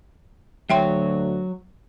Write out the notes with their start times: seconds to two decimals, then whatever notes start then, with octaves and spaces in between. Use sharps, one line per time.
0.70 D2 F#3 C#5 E5 G5 C6